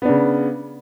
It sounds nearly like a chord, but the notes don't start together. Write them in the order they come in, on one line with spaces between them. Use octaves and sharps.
B3 D4 C#3